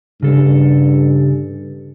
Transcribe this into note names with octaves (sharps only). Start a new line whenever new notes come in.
G2 C#3 A4